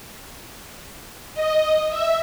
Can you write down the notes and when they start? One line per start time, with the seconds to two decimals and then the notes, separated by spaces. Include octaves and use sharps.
1.34 D#5
1.89 E5